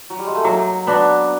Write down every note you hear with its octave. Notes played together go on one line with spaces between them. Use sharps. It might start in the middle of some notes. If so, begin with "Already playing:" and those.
F#3
G3
G#3
A3
F#3 A#3
B3 D4 F#4